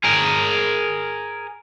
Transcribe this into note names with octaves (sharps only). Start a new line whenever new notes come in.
G#4 A#4